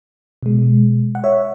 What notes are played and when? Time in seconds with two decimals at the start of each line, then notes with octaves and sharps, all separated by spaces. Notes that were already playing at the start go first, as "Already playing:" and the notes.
0.43 B2 G#3
1.15 F#5
1.24 C#5 E5